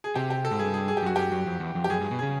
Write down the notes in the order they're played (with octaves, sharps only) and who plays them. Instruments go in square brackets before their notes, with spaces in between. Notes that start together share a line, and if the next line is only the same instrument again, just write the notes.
[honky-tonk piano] G#4
[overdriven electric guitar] C3 [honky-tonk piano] G4
[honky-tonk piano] G4
A4
[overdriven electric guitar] G#2
[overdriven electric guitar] G2 [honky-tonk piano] G#4
[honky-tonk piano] G#4
G#4
G4
[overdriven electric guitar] F#2 [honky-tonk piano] F#4
[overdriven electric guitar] F#2 [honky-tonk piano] G4
[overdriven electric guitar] F#2
F2
E2
F2
[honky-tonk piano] G4
[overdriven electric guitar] F#2 [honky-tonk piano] G#4
[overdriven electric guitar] G2
B2
[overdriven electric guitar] C#3 [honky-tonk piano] G#4